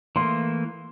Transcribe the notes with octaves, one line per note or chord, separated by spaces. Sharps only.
E3 A3 A#3 C6